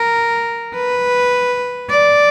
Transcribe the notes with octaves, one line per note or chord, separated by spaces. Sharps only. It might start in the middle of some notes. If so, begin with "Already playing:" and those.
Already playing: A#4
B4
D5